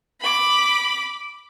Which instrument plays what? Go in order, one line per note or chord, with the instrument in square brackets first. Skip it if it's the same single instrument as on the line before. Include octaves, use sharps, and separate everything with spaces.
[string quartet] B5 D6